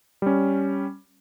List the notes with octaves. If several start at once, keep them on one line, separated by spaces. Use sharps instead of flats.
G3 C#4